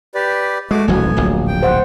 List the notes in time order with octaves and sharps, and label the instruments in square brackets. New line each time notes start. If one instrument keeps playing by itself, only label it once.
[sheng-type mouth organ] G4 B4 D5
[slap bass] G#3 [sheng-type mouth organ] A3 F#4 D6
[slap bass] D#1 A1 D2 [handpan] F#3 A3 [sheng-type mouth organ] B3 G#5
[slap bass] D1 A#1
[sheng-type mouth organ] G5
[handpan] C5 F#5